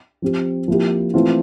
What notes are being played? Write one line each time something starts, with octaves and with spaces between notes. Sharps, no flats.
F3 C4 G4
F3 A#3 E4 G4
E3 A3 C4 F4